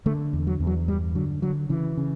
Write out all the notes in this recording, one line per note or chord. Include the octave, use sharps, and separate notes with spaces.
D3 A3
E2
F#3
E2
F#3
G2 G3
D3 F#3
D3 F#3
C#3 E3
C#3